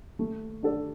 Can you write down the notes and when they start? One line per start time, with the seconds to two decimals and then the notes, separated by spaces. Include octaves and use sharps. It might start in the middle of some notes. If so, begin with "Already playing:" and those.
0.19 A3
0.63 D4 A4 D5